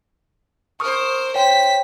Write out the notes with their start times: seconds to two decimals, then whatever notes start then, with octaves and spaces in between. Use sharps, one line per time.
0.80 A#4 C5 C#6 D#6 F6
1.35 C5 C#5 G5 B6